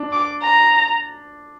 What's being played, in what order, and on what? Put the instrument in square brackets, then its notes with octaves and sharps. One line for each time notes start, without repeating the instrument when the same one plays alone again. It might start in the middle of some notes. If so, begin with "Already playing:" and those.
Already playing: [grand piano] D4
[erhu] D6
A#5